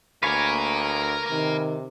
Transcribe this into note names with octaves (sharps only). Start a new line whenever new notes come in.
D2 A#4 B4 C#5 F5 G#5
C3 D#3